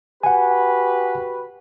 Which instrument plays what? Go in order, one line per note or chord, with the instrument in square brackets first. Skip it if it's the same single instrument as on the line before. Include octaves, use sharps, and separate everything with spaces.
[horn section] F#4 G4 B4 [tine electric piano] F#5 G#5